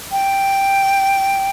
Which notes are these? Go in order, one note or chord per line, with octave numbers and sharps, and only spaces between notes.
G5